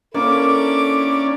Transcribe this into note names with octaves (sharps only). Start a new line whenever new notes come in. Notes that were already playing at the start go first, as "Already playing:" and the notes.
A#3 C#4 D4 E4 A4 D6